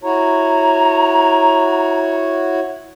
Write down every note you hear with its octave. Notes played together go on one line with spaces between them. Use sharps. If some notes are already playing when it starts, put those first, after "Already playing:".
E4 F#4 C#5 A#5